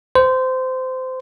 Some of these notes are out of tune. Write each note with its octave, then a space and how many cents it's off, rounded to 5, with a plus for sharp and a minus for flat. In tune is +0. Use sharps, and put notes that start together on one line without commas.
C5 -20